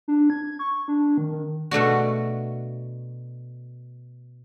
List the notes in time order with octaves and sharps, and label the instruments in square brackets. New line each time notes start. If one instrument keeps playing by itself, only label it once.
[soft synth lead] D4
G#6
C#6
D4
D#3
D#3
[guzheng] B2 A3 D4 F#4